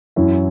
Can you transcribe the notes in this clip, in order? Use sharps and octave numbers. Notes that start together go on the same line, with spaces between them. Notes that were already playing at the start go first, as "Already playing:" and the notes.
F#2 E3 C#4 E4